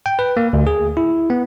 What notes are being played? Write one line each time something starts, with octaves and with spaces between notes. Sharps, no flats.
G5
B4
A#3
D2
G#4
E4
B3